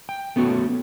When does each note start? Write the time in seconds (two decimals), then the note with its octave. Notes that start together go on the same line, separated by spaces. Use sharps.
0.09 G5
0.36 A3 B3 C#4 F#4 A4